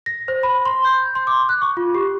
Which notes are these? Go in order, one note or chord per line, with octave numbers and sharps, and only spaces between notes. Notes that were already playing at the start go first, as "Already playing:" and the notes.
A#6
C5
B5
C6
G6
C6
D6
F#6
C#6
F4
G4